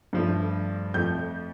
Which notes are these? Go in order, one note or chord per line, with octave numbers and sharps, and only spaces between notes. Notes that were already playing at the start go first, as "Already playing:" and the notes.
G2 F3 A3
F2 F3 A3 G6